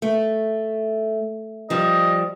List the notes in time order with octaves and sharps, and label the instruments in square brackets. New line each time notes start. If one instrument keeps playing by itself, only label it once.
[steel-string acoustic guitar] A3
[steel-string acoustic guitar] F3 G3 [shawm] D#5